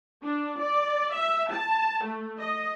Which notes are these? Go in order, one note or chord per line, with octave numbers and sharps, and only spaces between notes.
D4
D5
E5
A5
A3
D#5